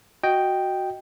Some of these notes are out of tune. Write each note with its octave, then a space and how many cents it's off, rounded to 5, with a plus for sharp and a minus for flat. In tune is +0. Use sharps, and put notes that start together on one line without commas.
F#4 +0 D#5 +0 G5 +0